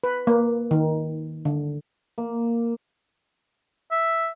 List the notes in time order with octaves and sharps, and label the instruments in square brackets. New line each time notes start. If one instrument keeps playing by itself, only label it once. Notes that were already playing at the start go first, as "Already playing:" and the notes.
[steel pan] B4
A#3
D#3
D3
[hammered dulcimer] A#3
[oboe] E5